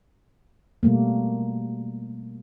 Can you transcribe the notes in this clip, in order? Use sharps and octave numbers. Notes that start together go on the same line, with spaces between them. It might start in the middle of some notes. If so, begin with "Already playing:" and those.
B2 G3 A3 A#3